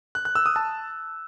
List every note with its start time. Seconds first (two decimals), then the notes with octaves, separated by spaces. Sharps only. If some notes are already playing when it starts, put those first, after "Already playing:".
0.15 F#6
0.25 F#6
0.35 E6
0.46 D#6
0.56 A5